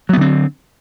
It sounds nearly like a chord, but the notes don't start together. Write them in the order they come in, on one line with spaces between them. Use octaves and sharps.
F#3 B3 D3 C4